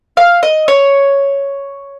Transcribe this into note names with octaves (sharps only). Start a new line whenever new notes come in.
F5
D#5
C#5